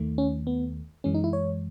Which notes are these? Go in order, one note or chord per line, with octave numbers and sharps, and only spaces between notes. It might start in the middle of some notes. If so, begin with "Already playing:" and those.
Already playing: D#2 D#3 A3
C#4
B3
F#2 E3 G#3 C#4
D#4
E4
C#5